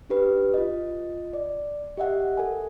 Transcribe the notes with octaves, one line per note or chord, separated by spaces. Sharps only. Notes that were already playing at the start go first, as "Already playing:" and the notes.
D4 G4 B4
F4 D#5
D5
G4 D#5 E5 F#5
A4 A#4 G#5